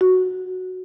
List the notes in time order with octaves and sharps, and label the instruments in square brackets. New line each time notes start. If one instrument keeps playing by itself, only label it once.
[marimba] F#4